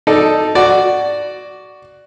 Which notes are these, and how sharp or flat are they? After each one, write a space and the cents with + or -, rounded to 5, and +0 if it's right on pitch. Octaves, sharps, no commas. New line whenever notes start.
D#4 +0 A4 +0 D5 +10
F#4 +10 D5 +0